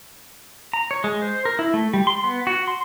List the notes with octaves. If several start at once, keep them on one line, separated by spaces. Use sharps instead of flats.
A#5
C#5
G#3
C5
A#4
E4
A3
G3
C6
B3
F#4
C6